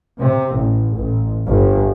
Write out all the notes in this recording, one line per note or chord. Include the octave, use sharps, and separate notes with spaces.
C3
A1
A1
G1